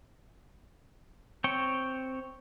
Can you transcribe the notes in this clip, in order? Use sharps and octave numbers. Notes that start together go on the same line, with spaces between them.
C4 C#5 G5